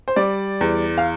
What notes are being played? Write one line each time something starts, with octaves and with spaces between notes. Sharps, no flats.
C5
G3 D5
E2
F5